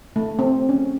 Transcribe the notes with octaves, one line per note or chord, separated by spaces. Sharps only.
A3
C4
C#4